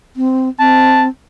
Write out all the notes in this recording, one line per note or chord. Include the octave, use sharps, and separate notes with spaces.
C4
C4 A5